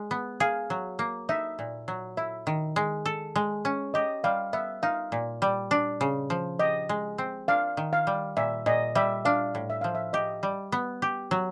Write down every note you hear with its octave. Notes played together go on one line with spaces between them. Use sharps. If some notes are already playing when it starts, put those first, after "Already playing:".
Already playing: G#3
B3
G#4 F5
F#3
A#3
D#4 E5
A#2
F#3
E4 E5
D#3
G#3
A4
G#3
C#4
G4 D#5
G3 F5
B3 E5
D#4 F5
A#2
G3
D4
C#3
F3
G4 D#5
G#3
C4
D4 F5
D#3
F5
G3
A#2 E5
A#2 D#5
G3 E5
D4 F5
A2
E5
F3 F5
E5
G4 D#5
G3
B3
G4
F#3